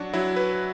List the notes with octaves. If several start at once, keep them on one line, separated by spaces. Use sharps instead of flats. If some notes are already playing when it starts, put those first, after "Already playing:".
Already playing: F#3 D4 F#4
F#3 E4
B4